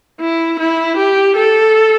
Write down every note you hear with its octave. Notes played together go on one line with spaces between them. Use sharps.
E4
E4
G4
A4